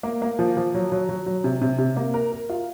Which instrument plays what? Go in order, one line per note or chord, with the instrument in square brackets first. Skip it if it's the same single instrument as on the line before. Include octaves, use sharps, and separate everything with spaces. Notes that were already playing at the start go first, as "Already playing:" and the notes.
[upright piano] A#3
A#3
F3
F3
F#3
F#3
F#3
F#3
C3
C3
C3
A#3
A#4
A#4
F4